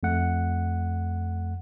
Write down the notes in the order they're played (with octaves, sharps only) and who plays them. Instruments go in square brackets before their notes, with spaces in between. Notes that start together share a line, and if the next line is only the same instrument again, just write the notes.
[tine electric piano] F2 A3 F#5